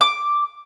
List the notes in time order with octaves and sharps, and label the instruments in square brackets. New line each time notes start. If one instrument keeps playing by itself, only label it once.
[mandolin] D6